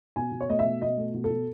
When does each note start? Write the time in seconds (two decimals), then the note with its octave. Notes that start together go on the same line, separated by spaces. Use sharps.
0.16 B2 G#5
0.32 B2
0.41 C#5
0.49 A3 D#5
0.59 E5
0.65 B2
0.82 B2 D#5
0.98 A3
1.14 B2
1.24 A4
1.30 B2